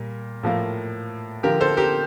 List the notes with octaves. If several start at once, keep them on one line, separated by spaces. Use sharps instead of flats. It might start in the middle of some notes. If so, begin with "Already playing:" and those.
Already playing: A#2 G3 A#3
A2 F3 A#3
D3 F3 A#3 G4 A#4
A4 C5
G4 A#4